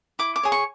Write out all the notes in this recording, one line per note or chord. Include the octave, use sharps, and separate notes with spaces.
E4 D6
D6
G#4 C#5
C#6